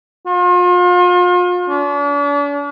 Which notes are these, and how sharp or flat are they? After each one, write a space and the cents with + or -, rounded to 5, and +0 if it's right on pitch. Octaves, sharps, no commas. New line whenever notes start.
F4 +40
D4 -40